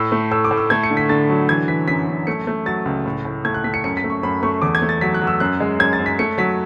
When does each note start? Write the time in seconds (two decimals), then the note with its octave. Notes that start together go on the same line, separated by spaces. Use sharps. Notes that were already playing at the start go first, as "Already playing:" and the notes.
Already playing: A2 E6
0.12 A3
0.31 A2 E6
0.44 D6
0.51 A2
0.57 E6
0.70 A3 G#6
0.83 C#7
0.91 D3
0.97 B6
1.09 D3 A6
1.29 F#3
1.49 E3 G#6
1.68 E3 B6
1.88 F#2 B6
2.08 F#2
2.27 A3 C#7
2.47 A3
2.66 F#3 A6
2.86 C#2
3.06 A2
3.25 A2
3.45 A3 G#6
3.54 F#6
3.64 A3 B6
3.74 C#7
3.84 F#2 C#7
3.97 B6
4.04 A3
4.10 C#6
4.23 F#2 B5
4.43 A3 C#6
4.62 E2 D6
4.75 G#6
4.82 A3
4.89 A6
5.01 F#3 B6
5.14 F#6
5.21 F#3
5.27 E6
5.40 F#2 F#6
5.60 G#3
5.79 F#2 G#6
5.93 A6
5.99 F#2
6.06 B6
6.19 A3 C#7
6.38 F#3 B6